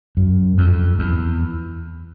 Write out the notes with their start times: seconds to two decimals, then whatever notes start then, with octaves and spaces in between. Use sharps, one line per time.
0.17 F#2
0.58 F2
0.99 E2